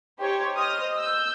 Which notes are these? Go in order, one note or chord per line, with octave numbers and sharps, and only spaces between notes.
D#4 G4 C5 C#5
C5 D#5 D#6 F6
E6 G6